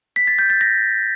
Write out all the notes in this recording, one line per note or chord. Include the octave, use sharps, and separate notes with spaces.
B6
A6
G6
A6
A#6